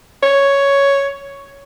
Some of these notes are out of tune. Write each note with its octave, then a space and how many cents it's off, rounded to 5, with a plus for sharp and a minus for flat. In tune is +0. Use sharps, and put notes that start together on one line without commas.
C#5 +5